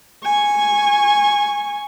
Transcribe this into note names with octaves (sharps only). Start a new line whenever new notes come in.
G#5 C#6